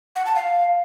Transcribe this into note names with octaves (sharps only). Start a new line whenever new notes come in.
F#5
A5
F5